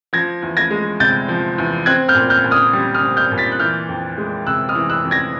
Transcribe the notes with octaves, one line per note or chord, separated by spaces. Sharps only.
F3 G#6 A#6
E2
G#6 A#6
G#3
C3 G6 A6
F3
E2
C4 F#6 G#6
F6 G6
A#2
F6 G6
A#2
D#6 F6
G3
D#6 F6
C4
F6 G6
A#2
A6 B6
F#6
E3 F6 G6
F2
G#3
C3 E6 F#6
D#6 F6
E3
E6 F#6
F2
G#6 A#6